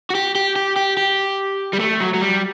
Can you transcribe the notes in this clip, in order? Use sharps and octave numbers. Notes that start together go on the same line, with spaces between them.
F#4
G4
G4
G4
G4
G4
G3
A3
F#3
F#3
G3